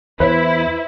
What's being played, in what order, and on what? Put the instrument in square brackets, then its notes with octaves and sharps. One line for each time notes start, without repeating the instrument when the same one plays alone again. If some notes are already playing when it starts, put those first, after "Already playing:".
[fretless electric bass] E2 [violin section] E4 [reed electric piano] B4 [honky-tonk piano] C5 F#6